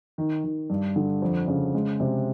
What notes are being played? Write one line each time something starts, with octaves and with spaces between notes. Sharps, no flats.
D#3
D#3
G2
D3
F2
C#3
G#3
C3